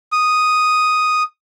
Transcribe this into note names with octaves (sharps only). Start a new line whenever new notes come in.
D#6